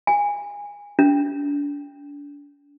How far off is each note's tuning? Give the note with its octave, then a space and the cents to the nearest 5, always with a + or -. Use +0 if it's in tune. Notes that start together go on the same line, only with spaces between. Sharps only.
G#5 -20
D4 -35